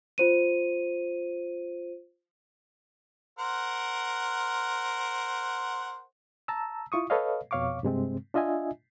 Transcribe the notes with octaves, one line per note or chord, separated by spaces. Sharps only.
F4 C5 D#7
A#4 C5 F#5
A5 A#5 E6
E4 F4 C#6 D#6
A4 B4 C#5 D#5 F5
F2 B2 C#5 F5 C#6 D6
G2 C3 G#3 C4
D4 F4 D#5 E5 G#5